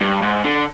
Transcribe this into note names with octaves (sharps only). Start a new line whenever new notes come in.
G2
G#2
D3